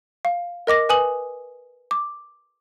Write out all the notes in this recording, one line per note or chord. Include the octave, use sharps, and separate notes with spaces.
F5
A#4 D#5 D6 A#6
B4 G#5 D#6 F#7
D6